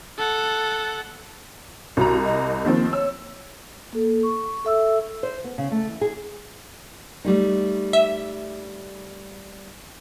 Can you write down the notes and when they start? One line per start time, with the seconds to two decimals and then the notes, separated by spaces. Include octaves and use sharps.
0.18 A4 F#5
1.97 C2 F#4 A#5
2.25 D#5
2.65 D#3 F3 A#3 C4
2.93 C#5 E6
3.93 A#3 A4
4.23 C#6
4.65 A4 E5 E6
5.23 C5
5.44 B3
5.58 C#3
5.71 A3
5.87 E3
6.01 G#4
7.25 G3 A3 D#4
7.93 E5